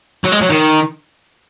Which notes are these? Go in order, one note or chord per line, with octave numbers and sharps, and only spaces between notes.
F#3
G#3
F#3
D#3